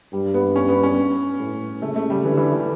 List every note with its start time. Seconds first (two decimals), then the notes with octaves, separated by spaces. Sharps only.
0.13 G2 G3
0.34 B3
0.56 C#4
0.69 B3
0.83 C#4
1.39 A2
1.82 C#3 A3
1.96 A3
2.10 G3
2.24 D3 E3
2.38 E3
2.52 E3